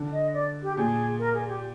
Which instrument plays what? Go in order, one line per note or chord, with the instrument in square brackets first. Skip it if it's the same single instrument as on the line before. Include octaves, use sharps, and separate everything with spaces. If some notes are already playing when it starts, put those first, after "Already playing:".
Already playing: [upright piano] D3
[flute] D#5
D5
G4
[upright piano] A#2 [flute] G#4
[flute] A#4
G#4
G4